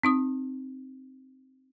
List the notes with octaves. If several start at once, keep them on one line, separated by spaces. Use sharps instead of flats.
C4 D#4 D#6